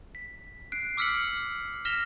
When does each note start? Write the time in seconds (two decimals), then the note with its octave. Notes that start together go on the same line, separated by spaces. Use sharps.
0.15 B6
0.72 F#6 C7 D7
0.97 D6 E6 F6 B6 C#7 F#7
1.85 F6 A#6 B6 E7 F7 G7